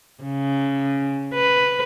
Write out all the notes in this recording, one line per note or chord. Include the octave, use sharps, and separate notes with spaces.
C#3
B4